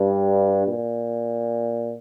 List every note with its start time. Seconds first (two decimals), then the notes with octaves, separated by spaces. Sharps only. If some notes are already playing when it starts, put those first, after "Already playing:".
Already playing: G2
0.68 A#2